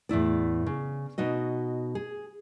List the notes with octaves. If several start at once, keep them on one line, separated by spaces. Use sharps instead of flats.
E2 A2 E4 D5
C#3
B2 D#4 F#4 D#5
G#4